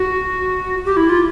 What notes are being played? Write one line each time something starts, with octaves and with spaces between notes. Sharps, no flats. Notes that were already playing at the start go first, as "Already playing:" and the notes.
Already playing: F#4
G4
E4
F4